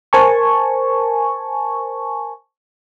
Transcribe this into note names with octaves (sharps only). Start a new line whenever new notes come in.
A#4 C5 G#5 A5 C#6